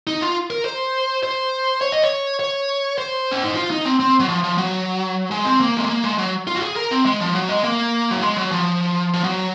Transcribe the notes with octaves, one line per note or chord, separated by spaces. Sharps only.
D#4
F4
A#4
C5
C5
C#5
D#5
C#5
C#5
C5
C#4
D#4
F4
D#4
C4
C4
F#3
F3
F3
F#3
G#3
C4
A#3
G#3
A#3
G#3
F#3
F4
F#4
G#4
A#4
C4
G#3
F3
F#3
G#3
A#3
F#3
G#3
F#3
F3
F3
F#3